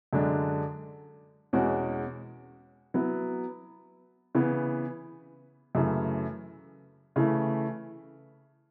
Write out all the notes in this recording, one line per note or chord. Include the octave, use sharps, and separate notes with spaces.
F#2 D3 G#3 D4
E2 B2 G#3 C#4 F#4
F#3 B3 E4
C#3 E3 B3
F#2 C#3 E3 A3
C#3 E3 A3 E4